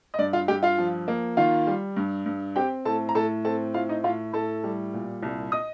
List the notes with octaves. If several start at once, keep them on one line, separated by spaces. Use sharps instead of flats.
D#5
G2 D5
F4 F5
G2 G4 G5
F4 F5
F3
A#3
D#3 F4 F5
G3
G2
G2
C4 G4 G5
A2 A4 A5
A#5
A2 A4 A5
C4 A4 A5
A2 F4 F5
D#4 D#5
A2 F4 F5
A2 A4 A5
G3
A#2
C2
D#5 D#6